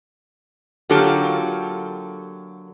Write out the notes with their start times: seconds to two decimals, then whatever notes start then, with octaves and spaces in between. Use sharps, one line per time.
0.90 D3 F#3 A#3 F4 G4 A4